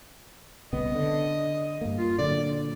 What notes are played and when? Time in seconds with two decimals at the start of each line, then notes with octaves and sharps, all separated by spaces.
0.73 C2 C#3 B3 D#5
0.95 D3
1.81 G2 A#3
1.98 F4
2.18 A#2 D3 F#3 D5